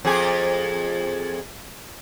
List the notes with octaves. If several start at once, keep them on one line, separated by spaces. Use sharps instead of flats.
F2 G#4